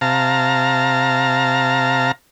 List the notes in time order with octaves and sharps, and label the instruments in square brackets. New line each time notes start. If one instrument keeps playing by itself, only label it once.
[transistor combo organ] C3 F5 A5 A#5